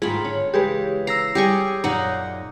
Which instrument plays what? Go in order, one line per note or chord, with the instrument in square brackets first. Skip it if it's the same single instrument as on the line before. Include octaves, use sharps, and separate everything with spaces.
[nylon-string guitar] G#2 D#3 A3 [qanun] F4 B5 [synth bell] G#4
[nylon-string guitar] D3 C#4 [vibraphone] C#5
[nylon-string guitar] C#3 E3 G#3 [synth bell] G4 G#4 B4
[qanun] A#5 [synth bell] E6 A#6 C7
[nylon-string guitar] G3 [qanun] G4 G#4 C#6
[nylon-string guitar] F#2 A#2 [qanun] D#4 F#5